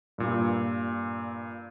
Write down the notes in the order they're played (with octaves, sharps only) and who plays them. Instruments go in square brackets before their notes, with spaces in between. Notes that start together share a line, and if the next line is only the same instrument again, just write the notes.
[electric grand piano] G2 A#2